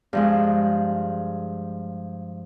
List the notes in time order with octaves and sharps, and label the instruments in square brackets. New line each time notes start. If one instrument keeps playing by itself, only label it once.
[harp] G2 F3 G#3